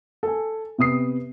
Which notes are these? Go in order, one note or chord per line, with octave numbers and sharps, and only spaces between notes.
A4 G#5
C3 B3 D#6 C7